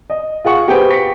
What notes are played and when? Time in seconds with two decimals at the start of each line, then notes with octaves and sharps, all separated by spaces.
0.10 D#5
0.45 F4 G#4 F#5 C#6
0.67 B3 G4 G#4 B4 C5 G5
0.90 C#6 B6 C#7